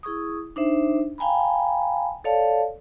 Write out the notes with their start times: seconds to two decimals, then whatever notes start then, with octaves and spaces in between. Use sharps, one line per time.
0.03 E4 G#4 C#6 D#6
0.56 D4 D#4 C5 E5
1.18 F5 G5 G#5 A#5 B5
2.24 A4 C#5 D5 F5 A5